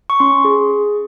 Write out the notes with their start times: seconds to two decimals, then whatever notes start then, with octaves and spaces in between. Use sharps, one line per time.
0.10 C#6
0.20 C#4 C6
0.45 G#4